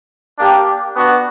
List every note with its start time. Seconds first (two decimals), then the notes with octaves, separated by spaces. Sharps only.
0.38 A#3 D4 G4
0.95 B3 D4 F#4